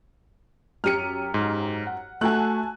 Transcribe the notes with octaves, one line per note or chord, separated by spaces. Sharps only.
F#2 G4 F6 C#7 D#7
G#2
F#5
A3 F#4 G#5 A5 F#6